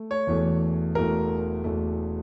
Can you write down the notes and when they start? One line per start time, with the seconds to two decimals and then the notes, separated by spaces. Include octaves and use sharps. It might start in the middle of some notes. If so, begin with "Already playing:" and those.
Already playing: A3
0.11 C#5
0.27 E1 E2 E3 A3
0.95 E1 E2 E3 A3 A#4
1.64 E1 E2 E3 A3